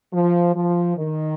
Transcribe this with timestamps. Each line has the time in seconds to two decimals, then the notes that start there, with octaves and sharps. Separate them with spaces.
0.12 F3
0.54 F3
0.96 D#3